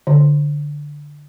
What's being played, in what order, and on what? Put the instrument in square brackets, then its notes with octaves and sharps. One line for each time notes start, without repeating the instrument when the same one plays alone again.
[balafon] D3